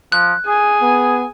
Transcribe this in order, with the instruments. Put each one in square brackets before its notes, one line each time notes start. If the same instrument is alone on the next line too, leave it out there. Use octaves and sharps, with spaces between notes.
[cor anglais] F3 [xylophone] F#6
[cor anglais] G#4 [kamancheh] G#5
[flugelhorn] B3